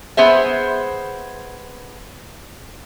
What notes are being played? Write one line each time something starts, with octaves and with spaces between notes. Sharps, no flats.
B3 G#4 C5 E5